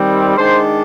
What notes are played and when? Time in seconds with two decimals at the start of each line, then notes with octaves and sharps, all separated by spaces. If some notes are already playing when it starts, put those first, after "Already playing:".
Already playing: D#3 G3 C4
0.37 D#3 G#3 D4 C5